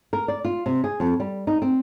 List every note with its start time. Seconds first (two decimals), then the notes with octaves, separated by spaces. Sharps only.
0.13 A#4
0.28 D5
0.44 F4
0.66 C3
0.84 G#4
1.00 F2
1.20 G3
1.47 D#4
1.62 C4